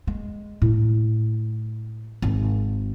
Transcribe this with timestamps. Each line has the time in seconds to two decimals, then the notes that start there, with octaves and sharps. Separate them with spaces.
0.07 G#3
0.62 A2
2.22 G#1